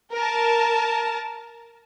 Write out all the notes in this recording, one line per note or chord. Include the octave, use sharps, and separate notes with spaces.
A#4 A5